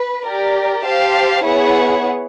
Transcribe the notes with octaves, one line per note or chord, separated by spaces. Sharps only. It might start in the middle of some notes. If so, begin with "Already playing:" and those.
Already playing: B4
G4 A#4 D5
G4 C5 F5 A5
B3 E4 G#4 C#5 F#5